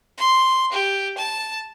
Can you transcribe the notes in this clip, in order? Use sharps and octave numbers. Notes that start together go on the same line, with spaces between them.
C6
G4
A5